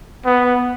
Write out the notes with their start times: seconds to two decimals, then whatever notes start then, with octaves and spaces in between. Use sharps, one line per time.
0.25 B3